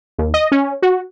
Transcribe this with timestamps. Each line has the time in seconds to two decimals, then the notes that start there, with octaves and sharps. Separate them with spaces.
0.18 D#2
0.34 D#5
0.52 C#4
0.82 F#4